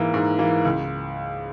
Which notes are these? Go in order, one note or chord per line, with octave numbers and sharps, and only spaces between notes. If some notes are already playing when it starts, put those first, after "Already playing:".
Already playing: G#2 E3 A#3
G#2
E3 A#3
C#2